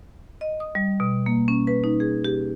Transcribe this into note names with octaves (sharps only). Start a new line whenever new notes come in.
D#5
D#6
G3
B2
A#3
C#4
B4
D#4
G#4
G4